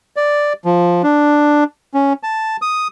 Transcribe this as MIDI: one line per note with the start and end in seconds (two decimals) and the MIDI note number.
0.16 0.53 74
0.65 1.02 53
1.03 1.64 62
1.94 2.13 61
2.23 2.57 81
2.62 2.88 87